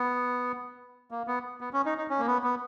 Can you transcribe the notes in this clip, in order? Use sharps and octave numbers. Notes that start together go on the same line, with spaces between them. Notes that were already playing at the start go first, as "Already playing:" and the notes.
Already playing: B3
A#3
B3
B3
C#4
D#4
D#4
C#4
A#3
B3
B3